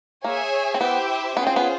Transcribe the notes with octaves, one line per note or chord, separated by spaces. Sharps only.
A#3 G#4 C#5 E5 G#5
C4
B3 E4 G4 C5 E5 G5
B3 C#4 F4 G#4 C5
C4
B3